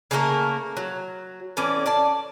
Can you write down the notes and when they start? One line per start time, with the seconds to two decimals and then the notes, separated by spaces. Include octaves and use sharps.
0.11 C#3 A3 A#3 A#4
0.77 F#3
1.57 A2 E3 C#4 D5
1.86 D5 A5